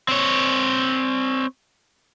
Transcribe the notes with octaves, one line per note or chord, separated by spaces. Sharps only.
C4 C#5